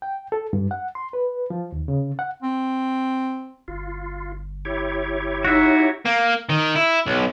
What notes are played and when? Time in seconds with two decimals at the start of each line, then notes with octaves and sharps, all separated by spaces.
0.02 G5
0.32 A4
0.53 G2
0.71 F#5
0.95 C6
1.13 B4
1.50 F3
1.72 D#2
1.88 C#3
2.19 F#5
2.42 C4
3.68 G1 F4
4.65 E4 G4 C#5
5.45 D#4 F#4 E5
6.05 A#3
6.49 D#3
6.76 E4
7.07 B1